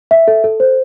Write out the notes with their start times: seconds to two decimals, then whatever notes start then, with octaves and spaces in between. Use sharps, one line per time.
0.11 E5
0.28 A4
0.44 A4
0.60 C5